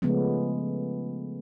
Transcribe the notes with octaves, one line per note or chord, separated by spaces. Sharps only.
C#3 F3 G#3 A3 B3 C#4